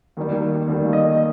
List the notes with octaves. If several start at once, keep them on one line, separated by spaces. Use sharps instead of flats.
D#2 D#3 G3 A#3
D#2 D#3 G3 A#3
D#5